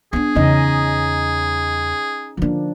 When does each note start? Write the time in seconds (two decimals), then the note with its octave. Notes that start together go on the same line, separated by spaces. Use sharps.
0.13 B3 D4 G#4
0.35 E2 C#3 C#4 D#4 D#5
2.37 D3 F3 A#3 D4